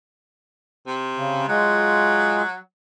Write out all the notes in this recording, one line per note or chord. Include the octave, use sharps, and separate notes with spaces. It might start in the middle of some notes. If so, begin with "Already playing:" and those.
C3
C#3
F#3 G#3 F4 G#4